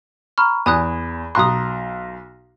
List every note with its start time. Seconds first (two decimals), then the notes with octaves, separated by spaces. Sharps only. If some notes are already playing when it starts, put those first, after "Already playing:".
0.38 A#5 B5 C#6 F6
0.66 E2 G#5 B5 D#6 F#6
1.35 B1 A#5 C6 D#6 F#6